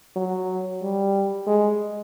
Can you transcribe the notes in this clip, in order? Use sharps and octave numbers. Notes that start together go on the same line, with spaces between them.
F#3
G3
G#3